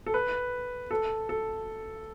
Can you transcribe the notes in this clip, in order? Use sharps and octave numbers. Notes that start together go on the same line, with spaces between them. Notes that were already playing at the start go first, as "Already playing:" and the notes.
A4
B4
A4
A4